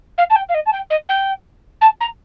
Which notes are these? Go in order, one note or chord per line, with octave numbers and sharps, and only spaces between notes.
F5
A5
G5
F5
D#5
A5
G5
D#5
G5
A5
A#5